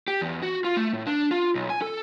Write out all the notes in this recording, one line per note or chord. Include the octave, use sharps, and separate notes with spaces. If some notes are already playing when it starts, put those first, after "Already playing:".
G4
E2
F#4
F4
A3
A2
D4
F4
B1
G#5
A4